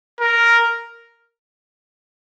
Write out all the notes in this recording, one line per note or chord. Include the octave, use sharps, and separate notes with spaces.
A#4